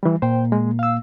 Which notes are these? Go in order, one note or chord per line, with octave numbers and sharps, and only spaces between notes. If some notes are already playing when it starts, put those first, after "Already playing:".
E3 G3
A#2 C5 G5
G#3
F5 E6